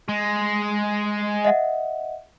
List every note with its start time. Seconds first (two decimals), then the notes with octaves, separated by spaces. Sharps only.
0.09 G#3
1.45 D#5 E5 F#5